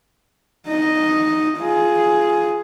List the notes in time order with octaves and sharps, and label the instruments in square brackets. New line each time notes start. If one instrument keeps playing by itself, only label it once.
[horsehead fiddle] D#4 D#5
F4 G#4